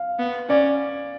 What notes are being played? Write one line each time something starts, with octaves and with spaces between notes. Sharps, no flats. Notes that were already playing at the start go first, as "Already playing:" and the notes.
Already playing: F5
B3
C#4 D5